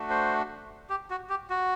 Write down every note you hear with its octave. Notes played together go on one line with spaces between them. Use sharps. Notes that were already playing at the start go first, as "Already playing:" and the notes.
Already playing: A3 D4 F#4
C5
G4
F#4
G4
F#4